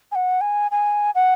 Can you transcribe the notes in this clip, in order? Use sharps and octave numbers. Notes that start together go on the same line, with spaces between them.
G#5
F#5
G#5
G#5
F#5